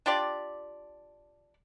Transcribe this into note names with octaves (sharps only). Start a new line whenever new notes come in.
D4 F4 G4 D5